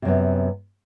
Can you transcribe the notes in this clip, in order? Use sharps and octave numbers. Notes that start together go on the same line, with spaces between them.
F#2 C3 B3